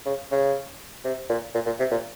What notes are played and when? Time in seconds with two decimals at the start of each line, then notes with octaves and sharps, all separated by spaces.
0.06 C#3
0.32 C#3
1.05 C3
1.29 A#2
1.54 A#2
1.66 A#2
1.79 C3
1.91 A#2